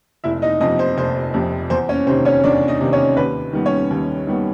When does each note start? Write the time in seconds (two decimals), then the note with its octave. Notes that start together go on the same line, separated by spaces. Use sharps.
0.24 F1 E4 E5
0.42 D#4 D#5
0.61 F2 C3 F3 D#4 D#5
0.79 C5
0.97 F1 C5
1.34 F2 C3 F3
1.70 E2 C5
1.89 C#4 C#5
2.07 C3 D#3 C5
2.25 C#4 C#5
2.44 E2 D4 D5
2.68 D#4 D#5
2.81 C3 D#3
2.93 C#4 C#5
3.17 D#2 B4
3.53 D#3 G3 B3
3.66 C#4 C#5
3.90 D#2
4.27 D#3 G3 B3